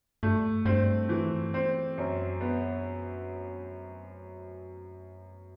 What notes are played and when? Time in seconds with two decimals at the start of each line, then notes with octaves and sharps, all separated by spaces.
0.23 G2 A3
0.65 G2 C4
1.09 E3
1.54 C4
1.98 F#2
2.41 B3